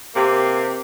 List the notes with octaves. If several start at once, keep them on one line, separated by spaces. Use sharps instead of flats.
C3 A#3 G4